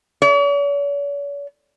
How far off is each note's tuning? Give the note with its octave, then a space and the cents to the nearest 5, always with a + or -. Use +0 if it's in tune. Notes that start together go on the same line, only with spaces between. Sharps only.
C#5 +45